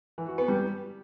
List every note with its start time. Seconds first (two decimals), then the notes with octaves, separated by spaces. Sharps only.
0.18 E3
0.28 F#4
0.38 B3
0.48 G3